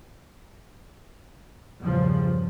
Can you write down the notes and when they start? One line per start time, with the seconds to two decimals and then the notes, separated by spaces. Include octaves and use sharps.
1.79 E2 G2 A#2 C#3 F3 G3